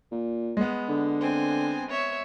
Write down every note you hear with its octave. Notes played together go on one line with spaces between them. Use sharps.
A#2
G#3 B3
D3
C4 G#5
C#5 E5